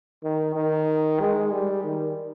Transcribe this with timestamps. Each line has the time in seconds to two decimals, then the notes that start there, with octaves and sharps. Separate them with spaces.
0.23 D#3
0.55 D#3
1.20 G#3
1.52 G3
1.84 D#3